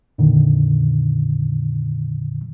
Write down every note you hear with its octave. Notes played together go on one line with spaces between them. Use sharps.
F2 A#2 D3 D#3